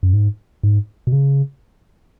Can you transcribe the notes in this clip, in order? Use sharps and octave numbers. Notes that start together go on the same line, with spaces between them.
F#2
G#2
G#2
B2
C#3